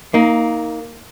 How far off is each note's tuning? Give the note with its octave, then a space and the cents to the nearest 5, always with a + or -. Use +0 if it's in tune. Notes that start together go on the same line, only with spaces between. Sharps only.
A#3 -5 D#4 +20